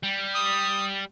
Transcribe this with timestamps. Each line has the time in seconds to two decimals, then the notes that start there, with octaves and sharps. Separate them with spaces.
0.03 G3
0.35 D#6